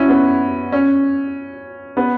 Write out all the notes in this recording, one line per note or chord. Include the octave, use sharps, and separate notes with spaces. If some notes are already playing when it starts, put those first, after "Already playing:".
Already playing: C#4 E4 F#4
B3
C#4
B3